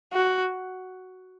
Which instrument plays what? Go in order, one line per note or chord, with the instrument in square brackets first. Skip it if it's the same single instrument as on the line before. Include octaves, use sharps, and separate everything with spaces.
[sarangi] F#4